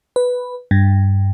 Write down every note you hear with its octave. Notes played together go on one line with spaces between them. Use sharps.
B4
G2